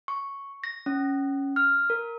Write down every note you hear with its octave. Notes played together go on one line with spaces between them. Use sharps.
C#6
A#6
C#4
F6
A#4